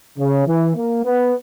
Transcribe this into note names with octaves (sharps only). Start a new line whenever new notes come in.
C#3
E3
A#3
B3